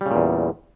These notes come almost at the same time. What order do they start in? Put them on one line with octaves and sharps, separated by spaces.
G3 C#3 A#2 E2